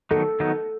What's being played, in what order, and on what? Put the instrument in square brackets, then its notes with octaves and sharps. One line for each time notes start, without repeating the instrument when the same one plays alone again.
[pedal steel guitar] D#3 F#3 B3 D#4 [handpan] A4
[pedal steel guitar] D#3 F#3 B3 D#4